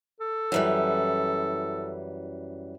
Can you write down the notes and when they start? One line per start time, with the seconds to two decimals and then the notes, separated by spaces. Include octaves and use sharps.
0.20 A4
0.52 F#2 E3 G3